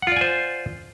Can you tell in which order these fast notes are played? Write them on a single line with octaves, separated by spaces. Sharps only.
F#5 F4 D5 G#5 C5